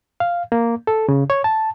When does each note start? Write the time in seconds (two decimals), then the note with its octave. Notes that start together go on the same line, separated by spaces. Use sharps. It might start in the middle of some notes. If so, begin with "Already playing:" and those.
0.20 F5
0.52 A#3
0.87 A4
1.09 C#3
1.30 C#5
1.44 A5